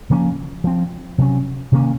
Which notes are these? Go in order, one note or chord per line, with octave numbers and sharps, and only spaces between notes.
C#3 F3 A#3 C#4
F3 C4
C3 F#3 C#4
C3 D#3 A#3 C#4